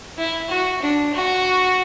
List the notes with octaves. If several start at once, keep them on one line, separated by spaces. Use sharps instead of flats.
E4
F#4
D4
F#4